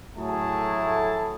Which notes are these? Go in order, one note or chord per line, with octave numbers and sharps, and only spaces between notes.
A2 F#3 A3 E4 G#4 A5